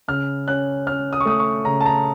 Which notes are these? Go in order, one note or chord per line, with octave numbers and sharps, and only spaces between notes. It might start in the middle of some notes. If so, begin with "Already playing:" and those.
C#3 F6
C#4 F#6
C#4 F6
D#6
C#6
A3 D#6
C#6
C#3 A#5
A5
A#5